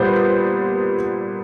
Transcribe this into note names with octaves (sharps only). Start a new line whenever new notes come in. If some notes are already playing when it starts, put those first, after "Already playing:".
Already playing: A#2 G3 B3 C5